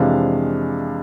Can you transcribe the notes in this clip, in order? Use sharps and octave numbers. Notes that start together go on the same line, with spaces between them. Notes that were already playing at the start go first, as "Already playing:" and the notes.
Already playing: F2 C3 E3 G#3 D4 F5